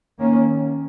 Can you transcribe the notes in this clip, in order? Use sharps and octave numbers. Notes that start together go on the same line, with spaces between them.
D#3 A#3 C#4